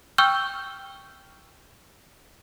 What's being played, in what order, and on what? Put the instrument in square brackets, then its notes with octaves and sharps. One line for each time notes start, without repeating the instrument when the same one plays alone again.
[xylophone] G5 C#6 E6 F6 G6